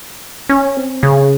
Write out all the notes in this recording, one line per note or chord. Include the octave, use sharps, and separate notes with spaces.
C#4
C4
C#3